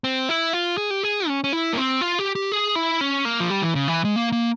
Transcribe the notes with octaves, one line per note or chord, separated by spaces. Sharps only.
C4
E4
F4
G#4
G4
G#4
C#4
C#4
E4
A#3
C4
F4
G4
G4
G#4
E4
C#4
A#3
F3
G3
E3
C#3
E3
G#3
A#3
A#3